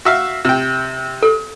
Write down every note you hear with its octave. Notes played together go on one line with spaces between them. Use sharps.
F#4 E5 F5
C3 G5
A4